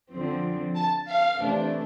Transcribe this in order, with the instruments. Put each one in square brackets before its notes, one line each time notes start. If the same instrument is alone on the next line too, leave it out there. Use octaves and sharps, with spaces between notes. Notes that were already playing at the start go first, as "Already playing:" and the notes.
[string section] D3 F3 C4
A5
F5
C3 E3 A3 D4